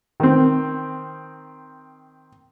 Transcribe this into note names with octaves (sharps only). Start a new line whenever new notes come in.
D#3 C4